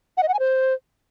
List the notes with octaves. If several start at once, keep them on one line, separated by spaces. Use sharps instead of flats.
F#5
D#5
F#5
G#5
C5